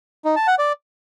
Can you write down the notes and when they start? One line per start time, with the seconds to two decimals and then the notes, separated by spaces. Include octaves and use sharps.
0.25 D#4
0.36 A5
0.47 F#5
0.59 D5